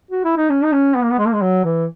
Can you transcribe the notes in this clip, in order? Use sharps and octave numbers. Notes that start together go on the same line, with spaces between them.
F#4
E4
D#4
C#4
D#4
C#4
B3
A#3
B3
G#3
A#3
G#3
F#3
E3